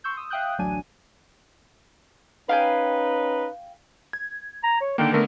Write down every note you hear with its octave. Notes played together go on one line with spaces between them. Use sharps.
C6 C#6 E6 G6
D#6 E6
E5 F5 G5 D#6 F#6 G6
A1 D2 F#3 D4 G#5 D#7
C#4 D#4 B4 F5 G5 G#5
G#6
A#5
C#5
D3 D#3 A#3 G5
D3 A3 B3 A#4